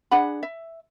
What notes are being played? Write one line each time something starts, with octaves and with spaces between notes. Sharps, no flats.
D4 G#4 F#5 B5
E5